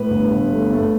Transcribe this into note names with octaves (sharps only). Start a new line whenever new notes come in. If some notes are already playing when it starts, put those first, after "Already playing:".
Already playing: A2 B4
G1
G1
A3
A3